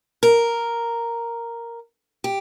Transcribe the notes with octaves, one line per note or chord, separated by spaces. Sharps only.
A#4
G4